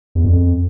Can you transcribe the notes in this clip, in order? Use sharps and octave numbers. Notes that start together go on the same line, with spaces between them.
E2
F2